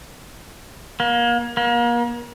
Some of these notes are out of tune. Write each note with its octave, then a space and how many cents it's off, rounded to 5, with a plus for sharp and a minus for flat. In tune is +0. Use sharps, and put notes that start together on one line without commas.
A#3 +30
A#3 +35